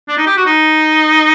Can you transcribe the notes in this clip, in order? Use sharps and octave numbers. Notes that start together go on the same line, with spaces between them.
D4
D#4
G4
F#4
D#4